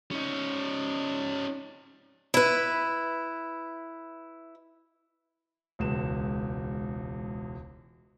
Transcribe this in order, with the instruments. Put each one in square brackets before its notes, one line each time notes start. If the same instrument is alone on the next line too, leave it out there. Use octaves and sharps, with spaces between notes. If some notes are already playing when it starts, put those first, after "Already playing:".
[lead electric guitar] C#4 D#4
[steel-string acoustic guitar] E4 B4
[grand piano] E1 C#2 E7